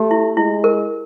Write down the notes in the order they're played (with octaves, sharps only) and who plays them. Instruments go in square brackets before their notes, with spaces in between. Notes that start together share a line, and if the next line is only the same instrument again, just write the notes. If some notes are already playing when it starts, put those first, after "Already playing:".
Already playing: [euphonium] A3 [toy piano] G4
[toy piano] E4
[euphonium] G#3 [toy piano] E4
[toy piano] A#4